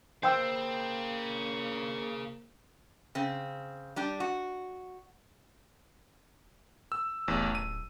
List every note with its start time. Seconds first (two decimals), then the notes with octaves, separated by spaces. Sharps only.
0.23 A#3 G#4 C5 F5 G5 E6
3.15 C#3 C4
3.96 G3 D4 G4
4.20 F#4
6.92 E6
7.28 D1 A1 E2
7.55 D#7